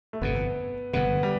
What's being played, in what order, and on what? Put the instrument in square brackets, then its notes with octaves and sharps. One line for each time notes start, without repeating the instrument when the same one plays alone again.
[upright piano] A3
[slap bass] G1 F2 C3 [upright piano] B3
[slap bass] G1 F2 C3 [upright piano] B3
[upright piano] G3